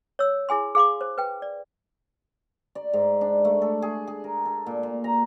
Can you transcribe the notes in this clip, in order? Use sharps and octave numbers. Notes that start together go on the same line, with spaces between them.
C#5 E6
E4 G#4 G#5 C6
G#4 F5 C6 D6
C5
B4 G5
D5
D5
G#2
D4
A3
A4
G#4
G#4
A#4
A4
A#2
A#2
A#5